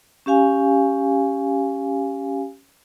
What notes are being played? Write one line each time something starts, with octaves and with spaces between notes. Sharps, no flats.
C#4 G4 F5 G#5